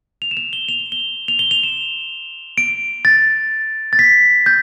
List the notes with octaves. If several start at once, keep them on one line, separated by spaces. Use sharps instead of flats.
F7
E7
F7
G7
F7
G7
F7
G7
F7
E7
D7
A6
A6
B6
G6